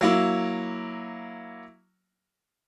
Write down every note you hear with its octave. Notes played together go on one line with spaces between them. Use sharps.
F#3 A#3 E4